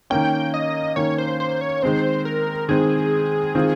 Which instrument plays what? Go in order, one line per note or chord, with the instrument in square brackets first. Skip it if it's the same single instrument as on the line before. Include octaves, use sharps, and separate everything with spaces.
[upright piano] D#3 A#3 C#4 [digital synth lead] G5
[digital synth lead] D#5
[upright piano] D#3 A#3 C#4 [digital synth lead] C#5
[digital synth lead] C5
C5
C#5
[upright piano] D#3 G#3 C4 [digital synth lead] C5
[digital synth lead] A#4
[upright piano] D#3 G#3 C4 [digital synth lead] G#4
[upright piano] D#3 G#3 C4 F4